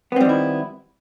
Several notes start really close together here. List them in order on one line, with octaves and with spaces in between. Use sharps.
B3 C4 G3 D#3 E4